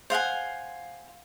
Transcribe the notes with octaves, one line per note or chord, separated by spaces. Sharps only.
C5 F5 F#5 G#5